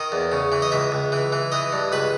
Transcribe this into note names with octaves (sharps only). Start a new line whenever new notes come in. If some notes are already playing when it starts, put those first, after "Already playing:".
Already playing: D#3 D#5
E2
C#3
E3
D#5
C#2 E5
C#2
E3
E3
E3 D#5
G2
C#2 B4